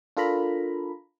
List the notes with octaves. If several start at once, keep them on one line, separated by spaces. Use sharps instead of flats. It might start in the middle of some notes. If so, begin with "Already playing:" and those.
D4 F4 A4 A#4 A#5 B5